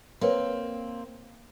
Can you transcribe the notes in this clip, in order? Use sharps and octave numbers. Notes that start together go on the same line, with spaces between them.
A#3 C4 A#4 B4 C#5